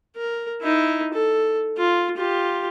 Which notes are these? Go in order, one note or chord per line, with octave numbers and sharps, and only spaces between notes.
A#4
D#4 E4
A4
F4
F4 G4